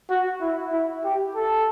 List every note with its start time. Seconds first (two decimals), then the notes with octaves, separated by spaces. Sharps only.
0.10 F#4
0.41 E4
0.72 E4
1.04 G4
1.35 A4